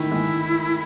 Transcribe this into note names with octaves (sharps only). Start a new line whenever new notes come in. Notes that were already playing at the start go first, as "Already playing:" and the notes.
Already playing: D#3 A3 E4
G#3